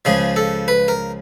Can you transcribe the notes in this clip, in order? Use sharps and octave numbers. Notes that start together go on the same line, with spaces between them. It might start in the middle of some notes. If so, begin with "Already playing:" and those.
C#2 C#3 F3 G#4
A4
B4
A#4